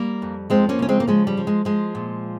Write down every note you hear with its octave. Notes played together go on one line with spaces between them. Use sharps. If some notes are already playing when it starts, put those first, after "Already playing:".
Already playing: G3 A#3
F2
F3 G#3 C4
A#3 C#4
C#3 C#4
G#3 C4
A#3
F3 G#3
G3
F3
G#3
F3 G#3
A#2